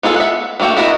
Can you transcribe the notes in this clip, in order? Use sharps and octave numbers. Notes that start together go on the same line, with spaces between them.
B3 F4 G#4 A4
E5 F#5
E3 A3 A#3 F#4 G5
B3 E4 F#4 A#4 D#5